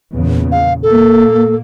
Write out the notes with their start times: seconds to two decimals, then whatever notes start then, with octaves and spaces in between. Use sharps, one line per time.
0.13 E2 A#2 C#3
0.51 F5
0.83 A#2 A#3 A4